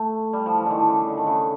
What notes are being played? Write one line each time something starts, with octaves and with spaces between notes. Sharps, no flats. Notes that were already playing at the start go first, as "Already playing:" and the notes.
Already playing: A3
G3
F3
E3
D3 D#3
D3
C#3
D3
D#3
C#3